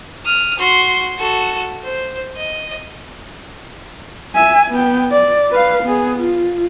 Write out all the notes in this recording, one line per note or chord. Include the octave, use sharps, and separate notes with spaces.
D#6 F6
F#4 C6
F#4 A4
C5
D#5
E5 G#5
B3 G5
D5
B4 F5
B3 G#4
F4